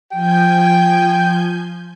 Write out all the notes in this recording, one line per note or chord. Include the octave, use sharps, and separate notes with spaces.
F3 G5 G#5 G6